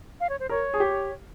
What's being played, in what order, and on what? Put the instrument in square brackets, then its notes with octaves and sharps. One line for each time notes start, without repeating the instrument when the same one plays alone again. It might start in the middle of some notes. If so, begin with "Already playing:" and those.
[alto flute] F5
C#5
C5
[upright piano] A#4 [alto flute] C#5
[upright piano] G#4
G4